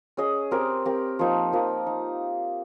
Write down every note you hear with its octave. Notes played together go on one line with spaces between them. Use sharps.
C#4 G#4 D#5
C4 G4 A#4
C4 G4 A#4
F3 A#3 D#4
F3 A#3 D#4
D#4